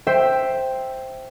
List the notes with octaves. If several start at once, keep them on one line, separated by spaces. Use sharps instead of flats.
C5 E5 G5